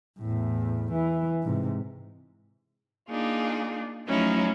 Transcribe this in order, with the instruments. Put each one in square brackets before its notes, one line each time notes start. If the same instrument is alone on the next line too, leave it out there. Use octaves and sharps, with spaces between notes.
[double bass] E2 A2
E3
G#2 C3
[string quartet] A#3 D4 D#4 F4 G#4
F3 F#3 A3 C#4 D#4 E4